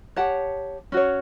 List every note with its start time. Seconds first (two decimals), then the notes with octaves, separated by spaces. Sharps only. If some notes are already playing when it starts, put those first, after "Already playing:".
0.16 G4 C#5 F#5 A5
0.92 C#4 F#4 C#5